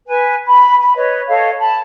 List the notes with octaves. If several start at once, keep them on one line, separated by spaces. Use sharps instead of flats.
B4 G#5
B5
B5
B4 C#5 D#5
A4 C#5 D#5 F5
A5 B5